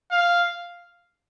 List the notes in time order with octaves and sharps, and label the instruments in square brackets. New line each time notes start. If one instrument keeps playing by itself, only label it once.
[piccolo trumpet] F5